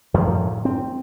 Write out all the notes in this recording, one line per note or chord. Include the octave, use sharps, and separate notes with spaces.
F#2 A2 F3 F#3
C4